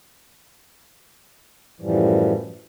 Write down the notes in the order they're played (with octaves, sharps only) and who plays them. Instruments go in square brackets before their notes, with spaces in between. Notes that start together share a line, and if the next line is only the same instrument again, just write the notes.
[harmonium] F#2 A2 E3 F3 G3